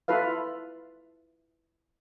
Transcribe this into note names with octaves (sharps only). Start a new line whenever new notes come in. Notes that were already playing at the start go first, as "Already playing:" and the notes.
E4 F4 A4 B4 F5